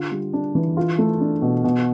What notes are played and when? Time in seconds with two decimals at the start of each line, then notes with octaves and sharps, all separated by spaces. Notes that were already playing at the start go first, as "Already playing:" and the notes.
Already playing: D3 F4
0.11 G3
0.33 D4
0.55 E3
0.77 F4
0.98 A3
1.21 D4
1.42 B2
1.64 B2